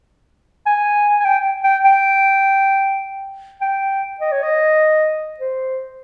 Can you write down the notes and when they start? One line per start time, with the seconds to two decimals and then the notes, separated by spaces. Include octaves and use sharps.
0.66 G#5
1.20 G#5
1.24 G5
1.64 G5
1.84 G5
3.61 G5
4.20 D#5
4.32 C#5
4.43 D#5
5.39 C5